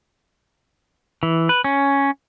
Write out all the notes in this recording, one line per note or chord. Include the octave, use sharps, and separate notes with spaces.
E3
B4
C#4